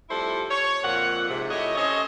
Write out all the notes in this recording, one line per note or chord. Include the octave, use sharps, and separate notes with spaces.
F2 G3 A3 E4 A4 C5
C#5
F2 A#2 F#5
G#2 C3
A3 E4 G4 C#5 D#5
C#4 A4 C5 C#5 D#5